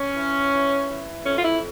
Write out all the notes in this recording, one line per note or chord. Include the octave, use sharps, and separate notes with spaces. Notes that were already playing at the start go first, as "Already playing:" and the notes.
Already playing: C#4
E3
E3
E3
F2 C#4
F4
E4